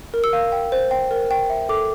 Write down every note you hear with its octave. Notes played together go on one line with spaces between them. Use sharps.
A#4
E6
F5
G5
C5
G5
A#4
G5
E5
A4 D6